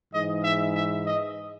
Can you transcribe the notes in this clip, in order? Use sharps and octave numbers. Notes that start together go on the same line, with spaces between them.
G#2 E3 D#5
E5
E5
D#5